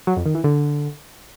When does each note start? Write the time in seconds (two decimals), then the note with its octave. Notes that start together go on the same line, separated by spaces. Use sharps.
0.07 F#3
0.16 F2
0.26 D#3
0.35 E3
0.44 D3